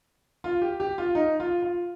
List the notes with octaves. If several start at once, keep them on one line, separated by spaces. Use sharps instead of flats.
F4
G4
G4
F4
D#4
F4
F4